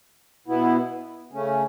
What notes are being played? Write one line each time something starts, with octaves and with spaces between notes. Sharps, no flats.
B2 B3 E4
C#3 A3 C#4